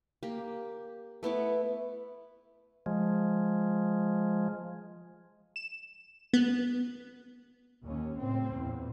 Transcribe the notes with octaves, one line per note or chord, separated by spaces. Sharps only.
A#3 G4
A3 B3 E4 D6
F3 G#3
E7
B3
D#2 C#4
C#2 A2 C4
E2 A#2